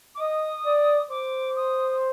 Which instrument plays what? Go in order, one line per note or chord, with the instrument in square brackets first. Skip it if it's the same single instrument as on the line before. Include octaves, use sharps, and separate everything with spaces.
[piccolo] D6
[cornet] D#5 [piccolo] D#6
[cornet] D5
[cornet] C5 [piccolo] D6
[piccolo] D#6